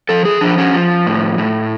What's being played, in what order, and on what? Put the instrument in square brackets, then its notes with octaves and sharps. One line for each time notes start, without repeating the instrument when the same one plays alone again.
[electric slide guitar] F3 A4
G#4
F3 D4
C#4
F3
A2
A2